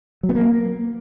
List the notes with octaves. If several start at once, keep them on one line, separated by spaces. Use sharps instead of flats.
F#3
B3
A#3